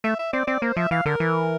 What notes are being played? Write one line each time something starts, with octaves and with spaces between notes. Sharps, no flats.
A3 E5
E5
C4 D5
C4 D5
A#3 C5
F3 E5
E3 F5
D3 A#4
E3